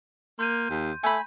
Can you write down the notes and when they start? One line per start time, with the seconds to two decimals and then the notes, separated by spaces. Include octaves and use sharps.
0.39 A#3 C6 G6 D#7
0.70 D#2
1.03 A3 G#5 B5